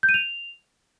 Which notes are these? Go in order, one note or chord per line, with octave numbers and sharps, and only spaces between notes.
G6
D#7
F7